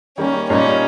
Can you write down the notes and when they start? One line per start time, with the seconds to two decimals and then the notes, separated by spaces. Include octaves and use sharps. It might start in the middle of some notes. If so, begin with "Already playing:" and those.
0.18 D#3 G3 A#3 C#4
0.49 A#2 G3 A#3 C#4 D#4